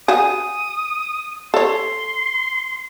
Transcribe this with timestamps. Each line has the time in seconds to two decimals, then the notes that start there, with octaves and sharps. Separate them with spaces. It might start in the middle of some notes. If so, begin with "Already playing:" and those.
0.08 F#4 G#4 D#6
1.54 A4 C#5 C6